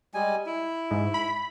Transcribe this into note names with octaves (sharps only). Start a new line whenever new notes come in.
G3 G#3 G#5
E4
G#2
B5